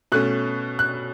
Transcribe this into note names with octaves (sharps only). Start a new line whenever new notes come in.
B2 A3 C#4 F#6
F#6